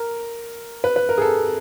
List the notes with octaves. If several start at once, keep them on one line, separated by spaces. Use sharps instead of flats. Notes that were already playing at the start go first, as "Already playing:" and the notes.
Already playing: A#4
B4
B4
A#4
G#4
A4